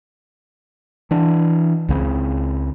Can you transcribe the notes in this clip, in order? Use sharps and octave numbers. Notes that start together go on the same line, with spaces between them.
E3 D4
C#2 C#3 C4